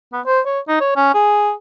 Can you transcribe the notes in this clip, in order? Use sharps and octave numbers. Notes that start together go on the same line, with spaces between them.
B3
C5
C#5
D#4
C#5
C#4
G#4